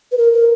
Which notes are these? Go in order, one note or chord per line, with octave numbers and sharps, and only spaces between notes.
B4
A#4
A#4